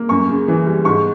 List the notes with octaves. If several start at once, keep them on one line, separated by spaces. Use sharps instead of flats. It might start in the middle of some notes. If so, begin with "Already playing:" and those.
Already playing: A#3
F#2 C#6
C#3
E3
G3
G#2 C#6